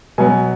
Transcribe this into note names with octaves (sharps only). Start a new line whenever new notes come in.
B2 F#3 B3 G#5